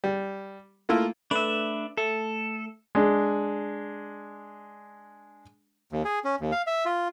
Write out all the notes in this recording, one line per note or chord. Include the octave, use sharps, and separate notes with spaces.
G3
A3 A#3 E4 F4
A3 D4 B4 E5
A3 A4
G#3 D4
D#2
G#4
C#4
D#2
F5
E5
F4